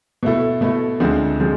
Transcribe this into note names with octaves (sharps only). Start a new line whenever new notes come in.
B2 A3 E4 A4
B2 A3 E4 A4
D2 D3 F3 G#3 C4
D3 F3 G#3 C4